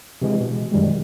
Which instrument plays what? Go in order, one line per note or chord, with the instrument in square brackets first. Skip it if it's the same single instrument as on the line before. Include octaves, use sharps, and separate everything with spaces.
[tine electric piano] C3 E3 G#3
B2
F#2 D#3 G3 G#3